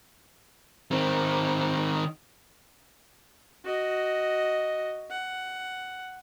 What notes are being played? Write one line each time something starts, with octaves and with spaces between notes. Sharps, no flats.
D#3 C4
F#4 D#5
F#5